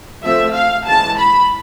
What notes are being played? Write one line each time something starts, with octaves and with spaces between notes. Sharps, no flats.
F3 A3 C4 E5
F5
E3 G#3 C#4 A5
B5